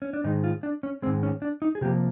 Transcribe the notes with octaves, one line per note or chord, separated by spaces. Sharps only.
C#4
D4
G#2 D#3 G#3 D#4
F4
D4
C#4
G#2 D#3 G#3 C4
C#4
D4
D#4
G#4
C3 F3 A#3 G4